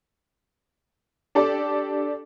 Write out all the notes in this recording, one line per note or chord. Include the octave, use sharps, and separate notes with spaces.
D4 G4 A4 D5